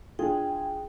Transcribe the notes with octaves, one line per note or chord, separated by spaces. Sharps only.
D4 F4 G#4 G5